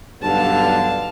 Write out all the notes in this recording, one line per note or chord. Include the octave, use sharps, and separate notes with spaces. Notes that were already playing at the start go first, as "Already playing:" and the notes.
B1 G2 D3 F5 A5